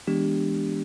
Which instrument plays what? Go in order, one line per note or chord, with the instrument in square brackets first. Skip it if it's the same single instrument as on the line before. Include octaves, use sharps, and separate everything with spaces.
[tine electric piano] E3 G#3 B3 D4 G4